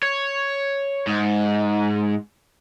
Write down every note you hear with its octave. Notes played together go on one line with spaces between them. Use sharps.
C#5
G#2